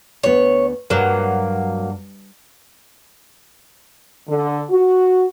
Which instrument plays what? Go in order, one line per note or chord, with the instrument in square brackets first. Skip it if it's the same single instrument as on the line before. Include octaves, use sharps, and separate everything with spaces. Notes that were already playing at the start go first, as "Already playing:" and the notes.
[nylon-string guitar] D2 B3 [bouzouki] C#5
[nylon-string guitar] G2 [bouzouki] F#3 A#3
[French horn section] D3
F#4